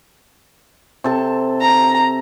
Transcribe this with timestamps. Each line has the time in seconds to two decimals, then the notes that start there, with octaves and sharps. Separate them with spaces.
1.04 C3 A4 A5
1.62 A#5